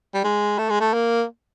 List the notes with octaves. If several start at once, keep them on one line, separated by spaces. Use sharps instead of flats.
G3
G#3
A3
G#3
A3
A#3